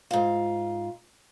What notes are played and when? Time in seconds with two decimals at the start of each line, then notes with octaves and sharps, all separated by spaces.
0.11 G#2 F4